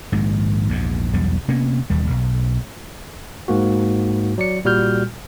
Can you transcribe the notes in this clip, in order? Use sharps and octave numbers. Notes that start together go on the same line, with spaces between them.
A#1 G#2 D#3 G#3
A#1 E2 G#2
B1 E2 G3 B3
C3 A#3 B3 C#4
E1 D#2 G3
B1
G#2 A#3 F#4
F#3 D5 C#7
A#2 G3 F#4 F6 G6